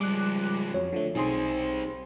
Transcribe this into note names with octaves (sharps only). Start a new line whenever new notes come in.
F3 G3 G#3 D6 F#6
F2 F#3 C#5
D3 F3 A3
B1 G3 C4 D#4 G#4 C6